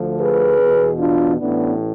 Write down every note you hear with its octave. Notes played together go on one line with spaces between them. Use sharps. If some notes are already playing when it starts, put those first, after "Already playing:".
Already playing: D2 D3 F3
G#4 B4
E2 B2
D4 F4
A1 A2 E3 B3 D4